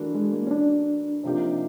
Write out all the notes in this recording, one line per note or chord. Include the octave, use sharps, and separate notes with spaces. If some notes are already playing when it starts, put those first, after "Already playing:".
Already playing: E3 A3 D4 F#4 A#4
G#3
A#3
C#4
D4
C3 F3 A#3 D#4 G4